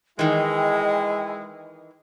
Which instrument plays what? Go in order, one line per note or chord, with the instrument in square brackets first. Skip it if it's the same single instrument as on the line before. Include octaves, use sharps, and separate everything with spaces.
[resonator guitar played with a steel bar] D#3 E3 [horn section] G#3 E4 [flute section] D#5 G5 G#5